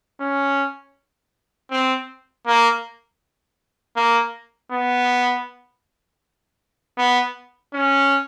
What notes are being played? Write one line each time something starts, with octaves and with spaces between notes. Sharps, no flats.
C#4
C4
A#3
A#3
B3
B3
C#4